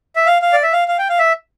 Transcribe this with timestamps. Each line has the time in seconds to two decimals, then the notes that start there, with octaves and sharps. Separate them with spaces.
0.16 E5
0.26 F5
0.42 F5
0.53 D5
0.63 E5
0.73 F5
0.88 F5
0.99 G5
1.09 F5
1.19 E5